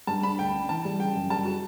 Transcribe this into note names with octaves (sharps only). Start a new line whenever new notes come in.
G2 A5
D4 B5
D2 G5
C#4
E3 A5
G3
C#3 G5
F#2
G3 A5
F#4